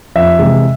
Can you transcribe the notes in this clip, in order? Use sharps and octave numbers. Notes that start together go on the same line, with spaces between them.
F2 E5
C3 E3 G#3